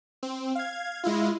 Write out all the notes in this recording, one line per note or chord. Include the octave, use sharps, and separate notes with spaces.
C4
F5 G#6
G#3 E4 F4